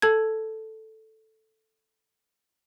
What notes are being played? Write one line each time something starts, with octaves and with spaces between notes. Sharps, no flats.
A4 A5 G#6